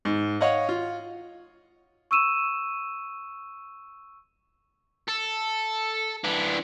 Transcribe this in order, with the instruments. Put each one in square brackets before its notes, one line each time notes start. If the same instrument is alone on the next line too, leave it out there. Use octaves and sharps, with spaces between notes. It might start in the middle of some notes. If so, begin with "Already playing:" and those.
[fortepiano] G#2
C#5 D#5 F5 F#5
F4
[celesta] C#6 E6 D#7 E7
[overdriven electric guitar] A4
E3 D4